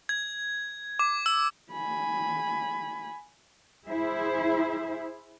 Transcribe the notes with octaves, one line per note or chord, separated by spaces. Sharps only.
G#6
D6
E6
G#5 B5
E4 G#4 C5 E5